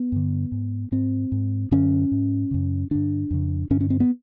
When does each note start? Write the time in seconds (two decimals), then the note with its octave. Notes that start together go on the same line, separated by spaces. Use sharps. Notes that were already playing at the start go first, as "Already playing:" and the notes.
Already playing: B3
0.12 G2 D3
0.52 G#2
0.92 G#2 C4
1.32 G#2
1.71 F#2 D3 C#4
2.12 G#2
2.51 F#2 C#3
2.91 G2 D3 D4
3.31 F2 C#3
3.70 G2 D3 C#4
3.81 C#4
3.90 C4
4.00 B3